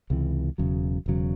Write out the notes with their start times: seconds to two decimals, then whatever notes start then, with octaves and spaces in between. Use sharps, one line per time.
0.10 C#2 C3 E3
0.58 E1 E2 C#3 F#3
1.06 E1 E2 C#3 F#3